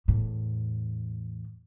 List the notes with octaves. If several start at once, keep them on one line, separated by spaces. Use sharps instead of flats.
E2 A2